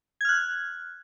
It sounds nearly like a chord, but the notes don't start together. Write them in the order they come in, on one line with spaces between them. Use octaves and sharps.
G#6 F6 F#6